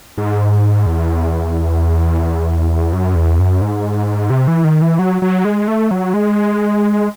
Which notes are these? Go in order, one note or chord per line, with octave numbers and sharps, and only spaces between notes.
G#2
E2
F#2
E2
F#2
G#2
C3
E3
D#3
E3
F#3
F#3
G#3
A3
F#3
G#3